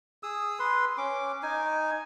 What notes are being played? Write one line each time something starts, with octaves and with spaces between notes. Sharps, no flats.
G#4 D#6 E6
B4 C6
C#4 D6
D#4 G#5